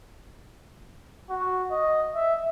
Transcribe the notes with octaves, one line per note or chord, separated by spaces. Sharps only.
F#4
D#5
E5